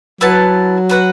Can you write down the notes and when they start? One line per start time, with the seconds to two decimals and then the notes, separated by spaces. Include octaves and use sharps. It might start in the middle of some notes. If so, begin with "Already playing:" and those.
0.21 F#3 E4 B4 F#5 A5
0.89 F#4 B4 F#5